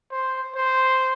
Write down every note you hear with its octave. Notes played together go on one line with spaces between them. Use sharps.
C5
C5